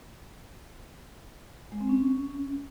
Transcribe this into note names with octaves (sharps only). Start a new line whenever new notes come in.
G#3
C4
C#4